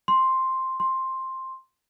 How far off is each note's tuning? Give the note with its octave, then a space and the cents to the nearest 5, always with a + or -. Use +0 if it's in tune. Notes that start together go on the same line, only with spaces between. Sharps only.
C6 +5
C6 +10